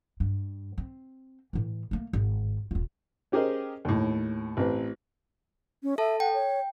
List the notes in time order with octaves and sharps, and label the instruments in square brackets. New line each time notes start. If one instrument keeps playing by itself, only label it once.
[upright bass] G2
C4
A2 E3
A3 A#3
G#1
D#1 F4
[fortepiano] C#4 G4 G#4 A#4 C5 D#5
D#2 A2
A1 C4 B4
[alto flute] C#4
[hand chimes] A4 A5 [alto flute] E5
[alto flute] F#5 [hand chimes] G5
[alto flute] C#5